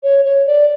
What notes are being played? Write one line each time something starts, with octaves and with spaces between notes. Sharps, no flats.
C#5
C#5
D5